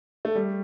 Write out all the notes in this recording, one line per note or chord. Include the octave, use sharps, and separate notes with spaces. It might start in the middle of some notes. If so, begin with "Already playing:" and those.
A3
G3